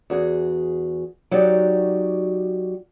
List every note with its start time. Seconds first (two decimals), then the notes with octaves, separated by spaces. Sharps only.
0.10 E2 F#4 G#4
1.31 F#3 D#4 F#4 G4 D5